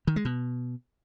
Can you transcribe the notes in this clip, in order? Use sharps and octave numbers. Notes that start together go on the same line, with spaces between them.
D#3
G#3
B2